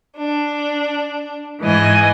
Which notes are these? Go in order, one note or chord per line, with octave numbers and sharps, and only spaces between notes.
D4
G#2 E3 D#5 G#5